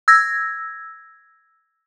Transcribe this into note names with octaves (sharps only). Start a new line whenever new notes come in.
E6 G#6 A#6